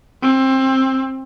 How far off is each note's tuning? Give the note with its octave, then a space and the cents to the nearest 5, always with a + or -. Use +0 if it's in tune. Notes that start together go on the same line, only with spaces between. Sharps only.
C4 +20